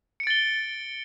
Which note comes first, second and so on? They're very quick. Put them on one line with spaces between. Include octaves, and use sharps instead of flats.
C#7 D7 A6 G7